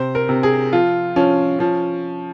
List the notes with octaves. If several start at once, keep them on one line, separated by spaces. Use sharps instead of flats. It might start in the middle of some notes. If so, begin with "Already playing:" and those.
Already playing: C3 C5
A#4
C3
G#4
F3 F4
F3 C#4
F3 C#4